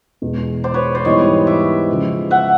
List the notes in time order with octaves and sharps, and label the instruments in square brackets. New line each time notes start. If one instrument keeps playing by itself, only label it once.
[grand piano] E2 B2 G#3
[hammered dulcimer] C5 D5
B4 C#5
C5 D5
[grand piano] G#2 E3 G3 B3 E4 [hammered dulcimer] C#5 D#5
[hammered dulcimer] D5 E5
[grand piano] C#3 F3 G#3
[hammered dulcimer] E5 F#5